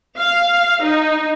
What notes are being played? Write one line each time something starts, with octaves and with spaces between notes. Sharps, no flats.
F5
D#4